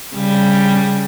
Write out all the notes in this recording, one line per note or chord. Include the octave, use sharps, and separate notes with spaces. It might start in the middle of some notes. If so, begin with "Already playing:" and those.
C#3 G3